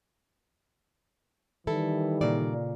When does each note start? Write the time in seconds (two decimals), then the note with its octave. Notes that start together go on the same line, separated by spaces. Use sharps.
1.67 D#3 E3 G3 E4 A4
2.21 A#2 C#3 A#3 D5